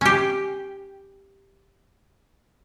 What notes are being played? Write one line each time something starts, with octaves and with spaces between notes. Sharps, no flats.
C#4 G4